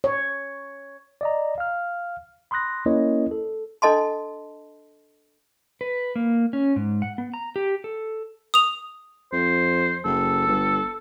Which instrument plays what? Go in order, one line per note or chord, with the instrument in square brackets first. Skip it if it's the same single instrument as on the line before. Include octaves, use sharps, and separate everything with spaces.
[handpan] C#5
[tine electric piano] D5 D#5 A#5
F5 F6
B5 C6 D#6 F#6 A#6
A#3 C#4 E4 A#4 C#5 D#5
A4
[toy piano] D4 A4 D#5 A5 C6
[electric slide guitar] B4
A#3
C#4
G#2
F#5
B3
A#5
G4
A4
[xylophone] D#6 F7
[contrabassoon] F2 [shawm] C5
[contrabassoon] F#1 [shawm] A4
[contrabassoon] G1